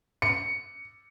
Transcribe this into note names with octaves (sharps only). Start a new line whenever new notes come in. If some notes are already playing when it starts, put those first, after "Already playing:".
C#7